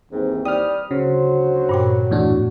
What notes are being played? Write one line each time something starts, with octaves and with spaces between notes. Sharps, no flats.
D#2 G#2 E3 C4
G3 G5 D#6 F6
D2 C#3 F#3 F#4 C5
G2 A#2 G5
E2 A2 D4 F#4